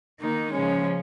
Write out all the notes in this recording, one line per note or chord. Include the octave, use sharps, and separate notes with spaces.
D#3 A#3 D#4
C#3 F3 G#3 C#4